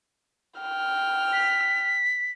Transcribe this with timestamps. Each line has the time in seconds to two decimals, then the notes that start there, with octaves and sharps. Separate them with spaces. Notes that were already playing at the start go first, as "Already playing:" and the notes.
0.58 G5 F6
1.33 B6